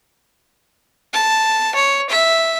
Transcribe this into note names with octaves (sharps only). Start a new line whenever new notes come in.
A5
C#5
E5